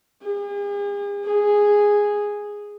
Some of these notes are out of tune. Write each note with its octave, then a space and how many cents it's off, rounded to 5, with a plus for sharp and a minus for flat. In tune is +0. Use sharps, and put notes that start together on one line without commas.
G#4 -45
G#4 -5